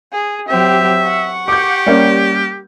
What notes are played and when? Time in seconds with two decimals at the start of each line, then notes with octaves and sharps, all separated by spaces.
0.13 G#4
0.48 F#3 C4 G4 E5
1.02 F#5 C#6
1.48 G4 D6 G6
1.86 G3 A#3 C#4